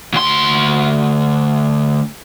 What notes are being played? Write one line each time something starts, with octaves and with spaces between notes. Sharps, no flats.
D2 C6